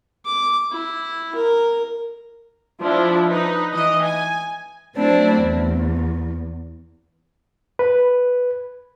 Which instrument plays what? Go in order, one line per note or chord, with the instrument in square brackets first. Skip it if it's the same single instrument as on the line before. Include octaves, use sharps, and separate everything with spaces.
[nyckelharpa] D6
E4
A#4
[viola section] F3 D4 E4
D#4 B4
E3 D#5
G#5
[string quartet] F#3 A3 C4 D4 E4
E2
[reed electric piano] B4